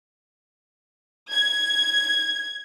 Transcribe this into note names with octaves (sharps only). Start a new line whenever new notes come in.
G#6